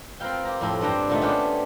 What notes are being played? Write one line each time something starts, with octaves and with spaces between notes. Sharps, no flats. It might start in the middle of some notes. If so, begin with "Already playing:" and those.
C4 F4 A#4 B4 F5 G5
A#3 G4 A#5
F2 A2 C4
G2 D4 G4 C5 G5 A#5
A#2 D3 A3 D#4
B3 C#4 D4 G4 B4 C5